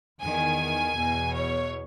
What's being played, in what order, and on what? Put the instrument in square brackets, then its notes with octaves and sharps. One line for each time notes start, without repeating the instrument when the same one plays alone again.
[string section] E2 D#3 G#5
E2 B2
C#5